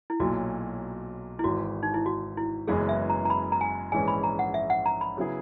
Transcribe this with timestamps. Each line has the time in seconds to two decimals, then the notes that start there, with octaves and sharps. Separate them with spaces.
0.10 E4
0.20 B1 A#2 F#3 F#4
1.39 E4
1.44 G#1 G#2 E3 F#4
1.83 D#4
1.94 E4
2.06 F#4
2.37 E4
2.67 F#1 F#2 E3 G#3 B3 G#4
2.89 E5
3.10 A#5
3.25 A#5
3.30 B5
3.52 A#5
3.61 G#5
3.92 A#1 G#2 E3 G#3 C#4 G#5
4.08 B5
4.23 A#5
4.39 F#5
4.54 E5
4.70 F#5
4.86 A#5
5.01 B5
5.17 C#3 F#3 B3 E4 G#4